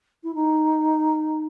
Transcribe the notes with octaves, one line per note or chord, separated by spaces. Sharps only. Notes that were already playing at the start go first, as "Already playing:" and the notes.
E4
D#4